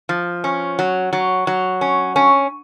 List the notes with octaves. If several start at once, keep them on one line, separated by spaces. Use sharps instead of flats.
F3
C#4
F#3
F#3
F#3
C#4
C#4